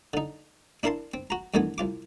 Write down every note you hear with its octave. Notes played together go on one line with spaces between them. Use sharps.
D3 D#4
D4 E4 A#4 F5 A5 C6
C4
F#4 A#5
G2 D#3 E3 A3 B3 G#5
C2 F4 D6